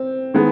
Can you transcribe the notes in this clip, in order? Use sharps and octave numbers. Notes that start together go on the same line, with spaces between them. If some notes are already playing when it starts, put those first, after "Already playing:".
Already playing: C4
D#3 G#3 B3